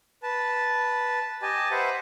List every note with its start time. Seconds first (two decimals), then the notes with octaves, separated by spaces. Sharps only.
0.23 B4 A5
1.42 G4 D#5 G#5 A5
1.71 B4 C5 E5 F#5